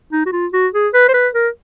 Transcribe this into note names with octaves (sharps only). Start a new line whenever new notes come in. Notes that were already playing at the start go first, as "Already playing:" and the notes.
D#4
F#4
F4
F#4
G#4
B4
C5
B4
A#4